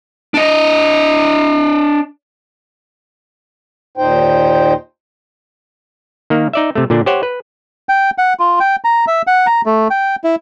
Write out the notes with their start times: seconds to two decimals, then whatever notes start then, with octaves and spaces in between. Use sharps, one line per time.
0.34 D4 D#5
3.97 D#2 A#2 D#4 C5 G5
6.30 D#3 A#3
6.53 D#4 D5 E5
6.75 C3 A3
6.90 A#2 D3 D4
7.06 G4 C5 C#5 F#5
7.23 B4
7.89 G5
8.18 F#5
8.39 F4
8.60 G5
8.84 A#5
9.07 E5
9.27 F#5
9.47 A#5
9.66 A3
9.91 G5
10.24 E4